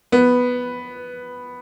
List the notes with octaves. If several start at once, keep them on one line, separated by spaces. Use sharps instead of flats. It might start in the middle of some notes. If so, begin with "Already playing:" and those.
B3